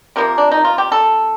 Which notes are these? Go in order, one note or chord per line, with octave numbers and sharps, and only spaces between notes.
C3 F3 A#3 A#4
D4
D#4
F4
G4
A4